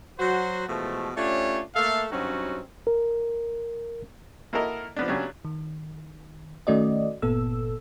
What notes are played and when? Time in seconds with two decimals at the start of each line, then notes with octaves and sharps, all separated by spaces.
0.19 F#3 F#4 C5
0.68 B2 E3 F3 G#3 A3
1.17 A3 C#4 D4 F4 G4 C#5
1.75 A3 A#3 A4 E5 F5
2.11 G2 F#3 C4 C#4 D#4 F#4
2.87 A#4
4.53 A#3 E4 F#4 A4 A#4 D#5
4.96 F3 B3 D4
5.08 C#3 F#3 G3 B3 C#4 D4
5.45 D#3
6.67 D#3 A3 C#4 F#4 D5 D#5
7.22 G1 A#2 B3 A4 E6